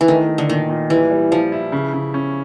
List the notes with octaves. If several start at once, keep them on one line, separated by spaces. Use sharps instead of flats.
E3
D#3 A3
A3
D3
A#2 D#3
A#2
E3 G3
G3
F3 G3
E4
C#3
C#3
C#4